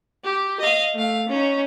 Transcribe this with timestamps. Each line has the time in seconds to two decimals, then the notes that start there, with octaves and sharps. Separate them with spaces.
0.24 G4
0.60 D#5 F5
0.95 A3 F5
1.28 C#4 D#4